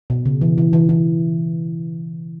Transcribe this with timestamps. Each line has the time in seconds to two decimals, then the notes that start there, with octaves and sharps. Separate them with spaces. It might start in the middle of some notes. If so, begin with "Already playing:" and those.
0.10 B2
0.26 C#3
0.41 E3
0.58 E3
0.73 E3
0.89 E3